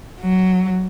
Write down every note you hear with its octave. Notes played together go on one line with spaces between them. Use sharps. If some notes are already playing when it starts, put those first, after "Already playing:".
F#3